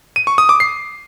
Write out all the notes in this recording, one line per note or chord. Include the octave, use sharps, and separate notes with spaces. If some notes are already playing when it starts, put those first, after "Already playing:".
D#7
C#6
D#6
D6
C7